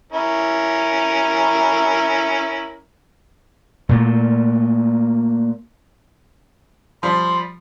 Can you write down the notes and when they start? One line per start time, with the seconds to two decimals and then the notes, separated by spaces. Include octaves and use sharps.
0.12 C#4 E4 A#4
3.89 A#2 A3
7.03 F3 G3 B5 C6